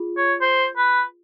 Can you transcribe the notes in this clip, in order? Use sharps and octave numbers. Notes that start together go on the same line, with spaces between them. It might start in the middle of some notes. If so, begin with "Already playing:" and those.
Already playing: F4 G#4
C#5
C5
B4